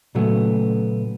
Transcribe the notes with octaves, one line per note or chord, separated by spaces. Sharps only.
A#2 C#3 F#3 A3 B3